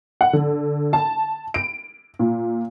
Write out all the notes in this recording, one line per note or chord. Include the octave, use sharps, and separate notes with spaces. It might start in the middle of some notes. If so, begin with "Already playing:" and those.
F#5
D3
A5
D7
A#2